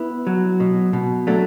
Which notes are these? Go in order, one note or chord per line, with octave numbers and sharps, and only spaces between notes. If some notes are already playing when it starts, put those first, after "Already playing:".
Already playing: B3 E4
F#3
B2
B2
F#3 A3 D4